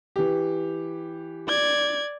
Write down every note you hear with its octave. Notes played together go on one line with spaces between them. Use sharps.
E3 G4
D5 G#6